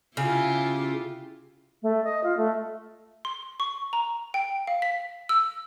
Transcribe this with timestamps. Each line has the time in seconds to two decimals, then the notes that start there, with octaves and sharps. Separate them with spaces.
0.17 C#3 E4 F4 G4
1.82 A3
2.04 D#5
2.24 F4
2.37 A3
3.25 C6
3.60 C#6
3.93 A#5
4.34 G5
4.67 F5
4.82 B6
5.29 E6